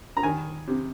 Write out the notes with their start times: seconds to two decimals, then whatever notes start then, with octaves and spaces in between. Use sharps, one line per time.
0.17 A#5
0.23 D#3 G#5
0.68 C3